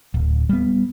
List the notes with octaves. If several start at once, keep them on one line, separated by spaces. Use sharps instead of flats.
D1
G3 B3